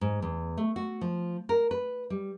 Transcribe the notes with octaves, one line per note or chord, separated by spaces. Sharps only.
G#2
E2
A3
F#4
F3
A#4
B4
G3